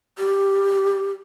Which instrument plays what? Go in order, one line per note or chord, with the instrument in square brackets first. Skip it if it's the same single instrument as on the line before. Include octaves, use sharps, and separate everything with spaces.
[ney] G4